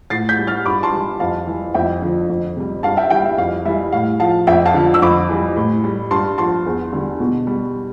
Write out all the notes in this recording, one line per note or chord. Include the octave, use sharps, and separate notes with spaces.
A2 A6 C7
G6 B6
G3
F6 A6
G2 B5 D6
A5 C6
E3 G3
F2 F5 A5
E3 G3
F2 E5 G5
D3 F3
F2
C3 G3
G2 F5 A5
E5 G5
E3 G3 E5 G5
E5
F2 F5
E3 G3 E5
A2 F5
F3 F5 A5
F2 E5 G5
F5 A5
D3 F3
E6
F2 B5 D6
E3 G3
A2
G3
G2 A5 C6
F3 A5 C6
E2
D3 G3
B2
G3